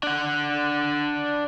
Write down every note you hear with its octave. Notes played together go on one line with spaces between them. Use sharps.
D4 F#5